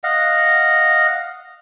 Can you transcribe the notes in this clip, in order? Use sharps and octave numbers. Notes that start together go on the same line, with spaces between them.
D#5 F5 F#5